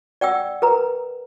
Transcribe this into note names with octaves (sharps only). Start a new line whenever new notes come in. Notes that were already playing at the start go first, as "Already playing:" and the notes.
D5 F#5 G5 E6
A#4 B4 A#5